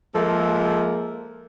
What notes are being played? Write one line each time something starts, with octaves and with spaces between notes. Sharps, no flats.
F3 G#3 A#3 A4 E5